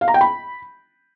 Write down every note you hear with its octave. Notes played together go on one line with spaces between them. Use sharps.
F5
A#5
G5
B5